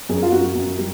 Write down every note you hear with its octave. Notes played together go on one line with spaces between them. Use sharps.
F#2 G#4
F4
F#2 F#4
F#2
G3